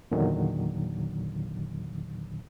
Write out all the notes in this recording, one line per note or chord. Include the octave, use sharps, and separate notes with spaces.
E2 A#2 D3 D#3 F#3